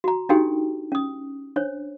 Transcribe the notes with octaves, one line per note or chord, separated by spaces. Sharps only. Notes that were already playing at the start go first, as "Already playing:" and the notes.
F#4 A#5
D4 D#4 F#4 G4 A4 G5
C#4 D#6
D4 C5 C#5